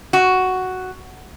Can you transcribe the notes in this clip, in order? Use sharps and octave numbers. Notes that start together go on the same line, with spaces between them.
F#4